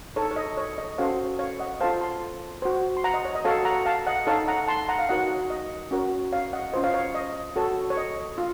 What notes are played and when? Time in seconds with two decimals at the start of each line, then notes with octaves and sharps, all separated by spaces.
0.16 D#4 A4 C#5
0.31 C#5
0.36 D#5
0.57 C#5
0.78 D#5
0.98 C#4 F#4 A4 C5 C#5 F5
1.39 C#5 F5
1.60 D#5 F#5
1.81 F4 A4 C5 F5 A5
2.01 A5 C6
2.62 F#4 C5
2.97 C6
3.04 F#5 A#5
3.14 D#5
3.25 C#5
3.35 D#5
3.45 F#4 A4 C#5 F5 A5
3.65 F#5 A#5
3.86 F5 A5
4.07 D#5 F#5
4.27 D#4 A4 C#5 F5 A5
4.48 F#5 A#5
4.68 A5 C6
4.89 F#5 A#5
4.99 F5
5.09 D#4 F#4 A#4 C#5 D#5 F#5
5.30 C#5
5.50 D#5
5.91 C#4 F#4 A#4 C#5
6.32 C#5 F5
6.53 D#5 F#5
6.73 C#4 F4 C5 D#5
6.83 C#5 F5
6.94 C#5 F5
7.15 D#5
7.56 F#4 A4 C#5
7.90 C#5
7.97 D#5
8.38 F4